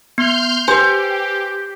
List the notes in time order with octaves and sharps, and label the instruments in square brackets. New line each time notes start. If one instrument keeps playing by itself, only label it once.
[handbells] B3 [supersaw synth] C6 F6 G6
[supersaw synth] G4 [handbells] B4 G#5 [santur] C5